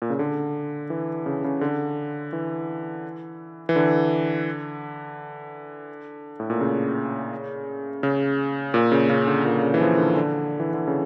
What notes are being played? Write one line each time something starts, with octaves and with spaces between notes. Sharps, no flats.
A#2
C#3
D3
E3
C#3
C#3
D3
E3
E3
D3
A2
A#2
C#3
C#3
A#2
C#3
C#3
D3
A#2
C#3
E3
F3
D3
D3
E3
D3
C#3